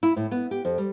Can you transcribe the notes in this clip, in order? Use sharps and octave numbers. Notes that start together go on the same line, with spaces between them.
E4
A2
B3
G4
F2
G3